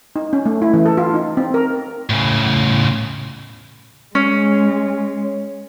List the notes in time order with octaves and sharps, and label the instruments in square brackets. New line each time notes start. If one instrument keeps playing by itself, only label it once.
[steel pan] D#4
C#4
A3
E4
E3
A4
F4
D#4
C4
A#4
[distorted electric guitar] A2 C#3
[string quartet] G#3 [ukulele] C#4